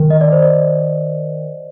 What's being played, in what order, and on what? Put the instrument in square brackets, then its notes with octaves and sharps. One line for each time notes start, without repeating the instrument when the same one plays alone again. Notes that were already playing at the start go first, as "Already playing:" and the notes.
Already playing: [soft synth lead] D#3
[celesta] D#5
D5
C5
D5